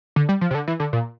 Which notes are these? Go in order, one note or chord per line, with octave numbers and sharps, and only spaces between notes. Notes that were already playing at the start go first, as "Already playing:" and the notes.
D3
G3
F3
C3
D3
E3
D3
A#2